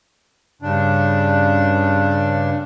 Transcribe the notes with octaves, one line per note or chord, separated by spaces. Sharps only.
G2 C#3 D4